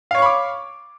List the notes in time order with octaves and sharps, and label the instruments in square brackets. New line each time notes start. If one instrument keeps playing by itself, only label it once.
[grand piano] F5
C#5
C#6
B5
D6